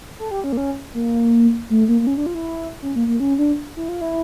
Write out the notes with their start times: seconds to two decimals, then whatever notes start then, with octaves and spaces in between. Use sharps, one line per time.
0.19 A4
0.31 G4
0.44 C#4
0.52 A#3
0.57 C#4
0.94 A#3
1.70 A3
1.88 A#3
2.01 A#3
2.07 C#4
2.17 D4
2.26 F4
2.35 E4
2.82 C#4
2.96 A#3
3.07 A#3
3.20 C#4
3.39 D4
3.77 E4
3.89 F4
4.01 E4